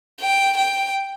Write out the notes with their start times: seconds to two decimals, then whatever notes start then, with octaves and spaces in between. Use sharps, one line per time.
0.21 G5
0.57 G5